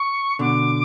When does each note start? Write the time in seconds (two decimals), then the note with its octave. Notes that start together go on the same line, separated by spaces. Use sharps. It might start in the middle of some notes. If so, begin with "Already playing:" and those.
Already playing: C#6
0.39 B2 D3 D6